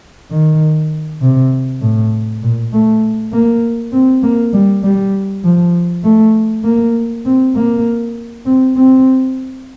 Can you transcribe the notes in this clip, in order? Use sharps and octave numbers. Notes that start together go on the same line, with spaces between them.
D#3
C3
A2
A#2
A3
A#3
C4
A#3
G3
G3
F3
A3
A#3
C4
A#3
C4
C4